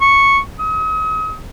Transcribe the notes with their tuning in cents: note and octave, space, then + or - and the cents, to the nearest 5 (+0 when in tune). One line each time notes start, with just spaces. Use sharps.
C#6 -5
D#6 +40